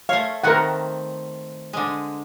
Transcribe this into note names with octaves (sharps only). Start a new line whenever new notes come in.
A3 C#5 F5
D#3 A3 C4 A#4 F#5
D3 G#3